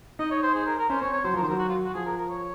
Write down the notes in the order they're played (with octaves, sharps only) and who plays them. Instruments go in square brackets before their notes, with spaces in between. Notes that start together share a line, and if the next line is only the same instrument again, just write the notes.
[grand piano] D#4 [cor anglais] D#5
[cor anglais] C#5
C5
G#4
A#4
A#4
[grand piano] C#4 [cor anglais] C5
[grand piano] C4 [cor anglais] C#5
[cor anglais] C#5
[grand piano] F#3 [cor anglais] C5
[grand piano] F3 [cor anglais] A#4
[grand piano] D#3 [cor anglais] C5
[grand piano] F#3 [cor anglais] A#4
[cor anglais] F#4
F4
F#4
[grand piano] F3 [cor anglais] G#4
[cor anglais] A#4
A#4
C#5